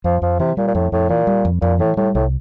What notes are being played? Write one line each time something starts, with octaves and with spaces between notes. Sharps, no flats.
F2 F3
F2 F3
C3 E3
A#2 G3
A#2
F2 A2
F2 A2
A#2 E3
G3
F2
F2 A#2
A2 E3
A2 G3
C2 A2